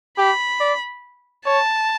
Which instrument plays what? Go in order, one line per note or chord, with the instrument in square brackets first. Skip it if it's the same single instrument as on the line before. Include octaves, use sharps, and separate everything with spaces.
[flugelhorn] G4 [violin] B5
[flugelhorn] D5
[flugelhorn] C#5 [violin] A5